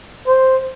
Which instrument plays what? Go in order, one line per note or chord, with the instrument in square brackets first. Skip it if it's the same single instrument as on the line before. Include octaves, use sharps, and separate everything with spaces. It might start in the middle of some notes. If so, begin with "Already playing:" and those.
[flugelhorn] C5